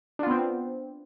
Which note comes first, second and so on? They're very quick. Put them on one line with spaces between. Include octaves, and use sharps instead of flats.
D4 F4 B3 C4